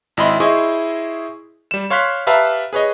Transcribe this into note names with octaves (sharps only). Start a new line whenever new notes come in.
G#1 E4 D#5 B5 C6
E4 G#4 C5 D#5 C6 C#6
G3 E7
C#5 F5 C6 F#6 B6
G4 B4 E5 F5 A5 A#5
G#4 B4 C#5 D#5